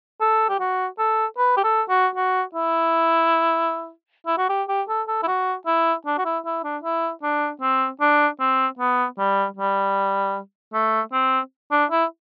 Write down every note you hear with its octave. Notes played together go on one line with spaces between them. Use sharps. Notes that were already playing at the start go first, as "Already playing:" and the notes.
A4
G4
F#4
A4
B4
G4
A4
F#4
F#4
E4
E4
F#4
G4
G4
A4
A4
E4
F#4
E4
D4
F#4
E4
E4
D4
E4
D4
C4
D4
C4
B3
G3
G3
A3
C4
D4
E4